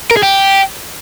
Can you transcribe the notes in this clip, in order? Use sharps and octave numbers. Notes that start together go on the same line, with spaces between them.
A#4
G#4
G4